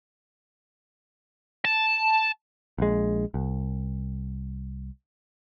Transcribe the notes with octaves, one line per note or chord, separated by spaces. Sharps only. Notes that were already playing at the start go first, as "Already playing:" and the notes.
A5
A#1 G#3
C2